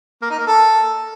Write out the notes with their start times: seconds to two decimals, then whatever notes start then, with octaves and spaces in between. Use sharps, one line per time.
0.22 A#3
0.30 D#4
0.39 A#3
0.47 A4